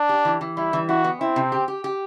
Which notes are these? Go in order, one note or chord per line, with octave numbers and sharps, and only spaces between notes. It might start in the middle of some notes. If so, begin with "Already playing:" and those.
Already playing: D4
G4
E3
E3
G3 E4
E3
E4 F#4
B3
C4 E4
C3
G4
G4
G4